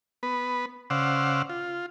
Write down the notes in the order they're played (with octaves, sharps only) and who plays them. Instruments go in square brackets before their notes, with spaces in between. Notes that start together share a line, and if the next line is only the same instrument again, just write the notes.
[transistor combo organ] B3 B4
C#3 C5 D5 F5 F#5 E6
F4